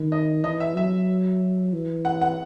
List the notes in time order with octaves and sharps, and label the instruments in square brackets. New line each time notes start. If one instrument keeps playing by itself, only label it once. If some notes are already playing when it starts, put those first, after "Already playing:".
Already playing: [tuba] D#3
[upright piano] D#5
[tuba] E3 [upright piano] D#5
[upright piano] E5
[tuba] F#3 [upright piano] E5
[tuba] E3
[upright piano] F#5
F#5